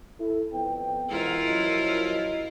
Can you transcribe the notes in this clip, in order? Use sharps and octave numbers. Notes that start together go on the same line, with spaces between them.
E4 A4
F2 B3 G5
E2 G#2 E4 F4 A#4
F#2 F3 D#5